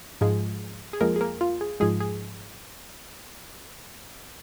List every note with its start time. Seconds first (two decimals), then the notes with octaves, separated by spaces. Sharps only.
0.21 G#2 F3 G#3 G#4
0.93 G#4
1.01 F2 F3 G#3 A#3 A#4
1.16 G#4
1.21 A#3 A#4
1.41 F4
1.61 G#4
1.80 G#2 F3 G#3 G#4
2.00 G#4